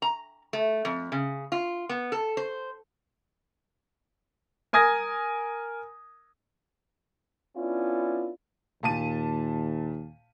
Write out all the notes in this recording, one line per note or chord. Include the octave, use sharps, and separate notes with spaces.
A#5
A3
F2
C#3
F4
B3
A4
C5
A#4 G#5 D#6 G#6 A#6
B3 C#4 D4 E4 F4
D#2 A#2 A5 D#7